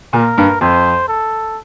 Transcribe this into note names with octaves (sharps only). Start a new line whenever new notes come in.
A#2 A#4
G2
F2 C5
A4